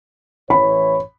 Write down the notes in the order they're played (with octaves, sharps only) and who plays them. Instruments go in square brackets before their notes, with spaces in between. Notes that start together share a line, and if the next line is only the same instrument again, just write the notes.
[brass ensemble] A1 E3 C#5 [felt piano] B5